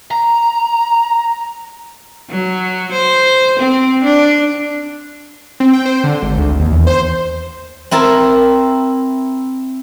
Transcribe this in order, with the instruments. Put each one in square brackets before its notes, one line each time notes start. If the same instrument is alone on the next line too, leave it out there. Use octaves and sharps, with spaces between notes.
[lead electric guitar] A#5
[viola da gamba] F#3
C5
C4
D4
[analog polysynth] C4
G5
C5
D3
G#1
D2
D#2
E2
C5
[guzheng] C4 E4 A#4 A5